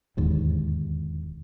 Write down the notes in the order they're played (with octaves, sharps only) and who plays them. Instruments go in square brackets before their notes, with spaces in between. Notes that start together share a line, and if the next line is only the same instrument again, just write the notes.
[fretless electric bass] E1 D#2 G#2 D3